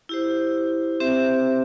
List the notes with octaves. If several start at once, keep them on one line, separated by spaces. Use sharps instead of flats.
E4 G4 C5
C4 G4 C5 E5